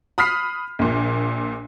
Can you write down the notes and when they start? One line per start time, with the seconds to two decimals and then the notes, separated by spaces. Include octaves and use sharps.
0.18 B5 D#6 F6 B6 C7
0.79 A#1 A#2